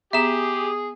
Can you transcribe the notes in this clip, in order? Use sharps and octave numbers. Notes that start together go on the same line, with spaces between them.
B3 G4 G#4 E5 A#5 E7